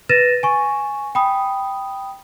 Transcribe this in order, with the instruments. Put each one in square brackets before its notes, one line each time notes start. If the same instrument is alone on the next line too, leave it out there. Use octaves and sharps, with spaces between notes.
[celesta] B4 A6 A#6 D#7 E7
G#5 C#6
G5 B5 D#6